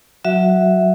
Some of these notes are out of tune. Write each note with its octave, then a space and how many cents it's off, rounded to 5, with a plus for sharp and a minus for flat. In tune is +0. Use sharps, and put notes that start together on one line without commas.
F#3 +0 F#4 +0 E5 +0